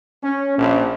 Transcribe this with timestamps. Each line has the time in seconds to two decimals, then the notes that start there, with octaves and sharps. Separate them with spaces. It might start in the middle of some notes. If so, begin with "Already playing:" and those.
0.23 C#4
0.58 A#1